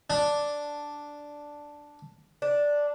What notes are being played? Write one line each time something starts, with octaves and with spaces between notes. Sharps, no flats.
D4
D4